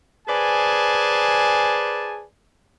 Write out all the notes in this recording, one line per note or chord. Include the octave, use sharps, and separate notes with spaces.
G#4 B4 C5 D5 G#5 A5